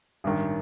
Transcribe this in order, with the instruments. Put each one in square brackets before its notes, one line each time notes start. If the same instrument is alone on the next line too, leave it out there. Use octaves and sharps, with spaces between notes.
[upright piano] A1 G2 D#3